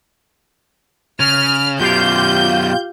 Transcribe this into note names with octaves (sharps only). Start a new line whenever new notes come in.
C#3 F6
F#2 B2 F4 G4 F5 G6